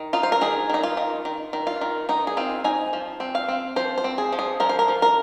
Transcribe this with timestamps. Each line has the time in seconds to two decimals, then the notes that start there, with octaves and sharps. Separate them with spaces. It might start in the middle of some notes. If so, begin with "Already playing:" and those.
Already playing: D#3
0.13 D#4 F4
0.23 C5
0.32 A#4
0.41 D#3 G#4
0.70 D#3 D#4
0.83 F4
0.97 D#3
1.25 D#3
1.53 D#3
1.67 F4
1.81 D#3
2.09 D#3 D#4
2.27 G#4
2.37 C4 F4
2.64 D#4 G#5
2.93 F3
3.20 C4
3.35 F5
3.48 C4
3.76 F3 C5
3.98 C5
4.04 C4
4.18 G#4
4.33 F3
4.39 G#4
4.60 F3 A#4
4.69 C5
4.79 A#4
4.88 F3
5.02 A#4